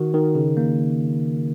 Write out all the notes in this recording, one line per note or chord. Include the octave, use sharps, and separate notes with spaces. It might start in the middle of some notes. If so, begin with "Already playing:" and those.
Already playing: D#3 F#4
D#3
C#3
A#3